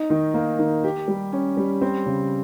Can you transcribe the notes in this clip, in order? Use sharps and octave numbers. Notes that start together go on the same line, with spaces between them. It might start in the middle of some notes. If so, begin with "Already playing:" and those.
Already playing: D#4
D#3
A#3
D#3
G4
G3
C#4
G3
C4
C#3